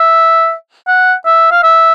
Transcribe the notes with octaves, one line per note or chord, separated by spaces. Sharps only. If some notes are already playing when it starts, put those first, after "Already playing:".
Already playing: E5
F#5
E5
F5
E5